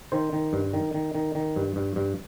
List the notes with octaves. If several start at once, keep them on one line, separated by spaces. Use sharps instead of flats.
D#3 C5
D#3
G2
D#3
D#3
D#3
D#3
G2
G2
G2